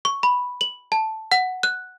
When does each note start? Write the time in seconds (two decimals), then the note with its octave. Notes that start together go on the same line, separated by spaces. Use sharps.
0.05 C#6
0.23 B5
0.61 F#7
0.92 A5
1.32 F#5
1.63 F#6